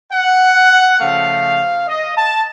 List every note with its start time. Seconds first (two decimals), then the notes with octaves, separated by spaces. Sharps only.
0.12 F#5
0.99 C#3 F3 A3 F5
1.87 D#5
2.16 A5